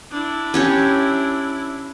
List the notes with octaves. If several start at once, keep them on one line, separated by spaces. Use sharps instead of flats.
D4 E4
C#4 G4 C#5